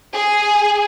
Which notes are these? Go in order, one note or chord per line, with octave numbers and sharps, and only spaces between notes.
G#4